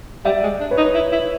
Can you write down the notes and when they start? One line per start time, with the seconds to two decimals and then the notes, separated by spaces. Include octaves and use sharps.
0.24 G3 D5 E5
0.43 G#3
0.60 D4
0.71 B4 C#5
0.77 D#4
0.94 E4
1.12 E4